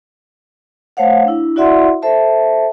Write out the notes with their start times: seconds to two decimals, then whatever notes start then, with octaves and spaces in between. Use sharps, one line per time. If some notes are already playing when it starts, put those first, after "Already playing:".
0.97 A3 C5 C#5 F5 F#5
1.25 D4 E4
1.56 E4 F#4 D5 E5 F#5 C6
2.02 A4 C5 E5 A5